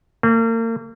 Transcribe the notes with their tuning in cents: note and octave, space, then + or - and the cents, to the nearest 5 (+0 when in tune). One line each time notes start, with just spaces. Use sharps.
A#3 -40